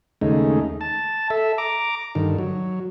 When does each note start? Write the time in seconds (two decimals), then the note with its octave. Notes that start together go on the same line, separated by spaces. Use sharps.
0.21 D#2 C#3 G#3 A3 D#4
0.81 A5
1.30 A4 E5
1.58 A#5 D6
2.15 G2 D3 D#3
2.38 F#3